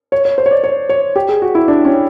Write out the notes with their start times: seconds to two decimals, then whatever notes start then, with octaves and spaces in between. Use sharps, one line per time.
0.12 C#5
0.25 C#5
0.38 C5
0.46 C#5
0.51 D5
0.64 C#5
0.89 C#5
1.16 G4
1.29 G#4
1.42 F#4
1.55 E4
1.68 D4
1.85 C#4